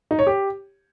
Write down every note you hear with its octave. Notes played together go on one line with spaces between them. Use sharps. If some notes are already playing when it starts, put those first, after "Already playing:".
D#4
C#5
G4